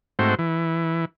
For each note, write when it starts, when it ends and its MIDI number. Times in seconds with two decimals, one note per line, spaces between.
0.19 0.35 44
0.19 0.35 57
0.19 0.35 60
0.19 0.35 66
0.19 0.35 72
0.39 1.05 52